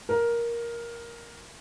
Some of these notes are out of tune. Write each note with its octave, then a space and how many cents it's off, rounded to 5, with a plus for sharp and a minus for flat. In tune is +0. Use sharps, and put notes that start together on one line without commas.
A#4 +10